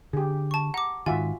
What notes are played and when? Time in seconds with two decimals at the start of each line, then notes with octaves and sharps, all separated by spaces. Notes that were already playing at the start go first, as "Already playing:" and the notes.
0.13 D3 G4 G#4
0.51 A5 C#6
0.74 F#5 A#5 D6
1.06 G#2 D#3 F4 F#4 E5 G#5